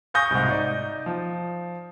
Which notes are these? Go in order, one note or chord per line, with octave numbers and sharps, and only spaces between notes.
F5 G#5 C#6 D#6 G6 A#6
C2 G#2
D#4 D5
F3